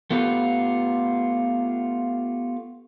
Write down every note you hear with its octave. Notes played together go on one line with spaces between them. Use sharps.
A3 B3 F4 G4 A4 B4